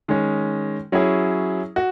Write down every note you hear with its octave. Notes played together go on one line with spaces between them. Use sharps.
D#3 G#3 C#4
F#3 C#4 E4 G#4
F#4